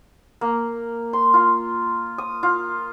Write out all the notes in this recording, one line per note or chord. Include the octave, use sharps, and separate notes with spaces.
A#3
C6
F4
D#6
F4